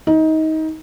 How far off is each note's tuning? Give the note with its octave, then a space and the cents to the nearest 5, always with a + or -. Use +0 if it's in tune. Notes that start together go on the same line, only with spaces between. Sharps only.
D#4 +25